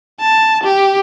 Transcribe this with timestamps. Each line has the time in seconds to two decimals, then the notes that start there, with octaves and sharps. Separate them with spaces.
0.20 A5
0.63 G4